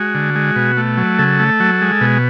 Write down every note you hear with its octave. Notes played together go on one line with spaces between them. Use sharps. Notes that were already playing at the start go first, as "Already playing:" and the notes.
Already playing: G#3 F#4
D3
G#3
B2
A3
F#3
C#3 A4
A3
F#3
G#3
B2